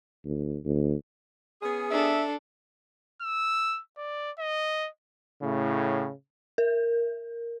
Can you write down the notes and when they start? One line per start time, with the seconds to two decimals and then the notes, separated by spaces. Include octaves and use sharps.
0.25 D2
0.65 D2
1.61 B3 C#4 G#4
1.90 D4 A4 E5
3.22 E6
3.97 D5
4.39 D#5
5.42 A2 C#3
6.58 A#4